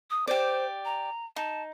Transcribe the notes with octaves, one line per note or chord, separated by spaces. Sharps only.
D#6
G4 C5 D5
A#5
D#4 A5